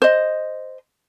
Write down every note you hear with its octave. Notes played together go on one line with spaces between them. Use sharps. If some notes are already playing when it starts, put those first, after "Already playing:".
C5 D#5